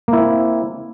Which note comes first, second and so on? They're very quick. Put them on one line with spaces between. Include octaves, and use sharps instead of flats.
A#3 E4 C4